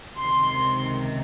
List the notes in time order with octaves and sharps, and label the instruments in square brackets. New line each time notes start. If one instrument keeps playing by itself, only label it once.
[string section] C#2 C3 D#3 C6